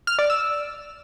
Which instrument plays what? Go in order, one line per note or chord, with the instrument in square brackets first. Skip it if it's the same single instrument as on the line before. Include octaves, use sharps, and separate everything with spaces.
[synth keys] F6
D5
E6